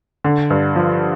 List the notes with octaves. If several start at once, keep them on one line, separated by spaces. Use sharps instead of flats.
D3
G2
F3